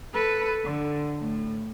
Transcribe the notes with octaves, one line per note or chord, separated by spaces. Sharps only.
A4 B4
D3
A2